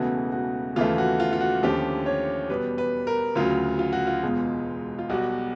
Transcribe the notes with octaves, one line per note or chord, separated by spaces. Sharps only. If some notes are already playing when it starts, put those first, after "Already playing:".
Already playing: E1 E2 C#3 E3 A3 F#4
F#4
D#2 C#3 E3 A3 F4
F#4
F4
F4
F#4
D#2 D3 F3 A3 C#4 G4
C#5
E2 B2 G3 B4
B4
A#4
D2 C#3 F#3 F4
F4
F#4
F4
E1 E2 B2 G#3
F4
B1 B2 G3 F#4